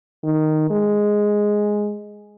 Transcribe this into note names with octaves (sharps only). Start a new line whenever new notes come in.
D#3
G#3